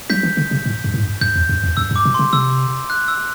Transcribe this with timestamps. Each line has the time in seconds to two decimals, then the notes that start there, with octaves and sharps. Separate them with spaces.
0.10 F#3 G6 B6
0.23 E3
0.37 D3
0.51 C3
0.66 A2
0.84 G2
0.94 A2
1.02 G2
1.21 G2 G6
1.36 E2
1.49 F#2
1.64 E2
1.77 F#2 E6
1.91 G2
1.96 D6
2.05 B2
2.14 C3 C6
2.33 C3 E6
2.90 F#6
3.08 E6